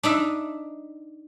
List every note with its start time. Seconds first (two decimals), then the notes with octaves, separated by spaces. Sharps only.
0.03 D4 D#4 E5